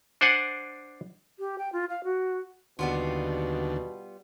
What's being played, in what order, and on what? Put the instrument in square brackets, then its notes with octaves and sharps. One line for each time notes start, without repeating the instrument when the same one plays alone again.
[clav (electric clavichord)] D4 C5 D5 F#5 G#5
[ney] G4
G5
F4
F5
F#4
[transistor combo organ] D#2 D3 [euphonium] B2 [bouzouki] G3 B3 F4